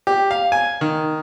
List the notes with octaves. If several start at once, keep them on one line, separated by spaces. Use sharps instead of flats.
G4
F5
G#5
D#3